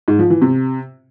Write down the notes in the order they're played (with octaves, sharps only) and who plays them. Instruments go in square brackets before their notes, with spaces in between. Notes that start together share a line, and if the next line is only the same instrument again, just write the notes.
[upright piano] G#2
F3
E3
C3